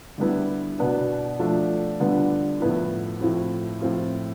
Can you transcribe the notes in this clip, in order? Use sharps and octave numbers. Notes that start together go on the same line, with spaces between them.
D3 G3 B3 E4
B2 B3 D4
F3 A3 D4
D3 G3 B3 D4 F4
A2 F3 B3 E4
A2 F3 A3 C4 E4
A2 F3 C4 F4